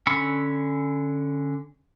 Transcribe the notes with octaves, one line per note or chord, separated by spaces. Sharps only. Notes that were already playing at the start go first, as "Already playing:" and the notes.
D3 C#4 B5 C#6 E6